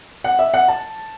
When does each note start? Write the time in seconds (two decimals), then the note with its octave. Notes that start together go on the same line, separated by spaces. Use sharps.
0.24 F#5
0.39 E5
0.54 F#5
0.68 A5